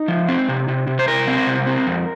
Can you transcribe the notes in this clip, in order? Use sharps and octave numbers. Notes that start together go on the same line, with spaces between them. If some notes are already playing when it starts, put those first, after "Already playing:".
Already playing: D#4
F3
C4
C3
C3
C3
C5
C3 A#4
C4
C3
C4
F2